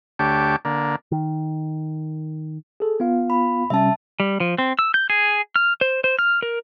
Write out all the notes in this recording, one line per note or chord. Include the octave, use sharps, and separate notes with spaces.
D2 A3 G4 C#5 D6
D3 A#3
D#3
G#4 A4
B3 F4 F5
B5
C3 G3 C#4 E5 A5
G3
F3
C4
E6
G6
G#4
F6
C5
C5
F6
A#4